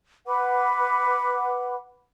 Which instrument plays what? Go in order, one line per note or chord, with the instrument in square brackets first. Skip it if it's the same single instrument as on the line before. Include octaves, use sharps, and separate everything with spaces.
[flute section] B4 F#5 B5 D6